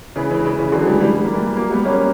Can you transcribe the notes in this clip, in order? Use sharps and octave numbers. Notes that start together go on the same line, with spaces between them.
C#3 E3
C#3 E3
C#3 E3
C#3 E3
D3 F#3
E3 G3
E3 G3
G3
A#3
E3 G3
F#3 A#3
G3 B3
A#3 C#4